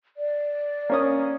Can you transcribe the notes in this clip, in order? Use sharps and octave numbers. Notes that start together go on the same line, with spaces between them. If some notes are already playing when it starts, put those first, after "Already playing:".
D5
A#3 C#4 D#6